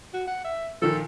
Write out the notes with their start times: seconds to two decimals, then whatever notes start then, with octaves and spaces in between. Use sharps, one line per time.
0.14 F#4
0.27 F#5
0.44 E5
0.82 A#2 D#3 F3 A4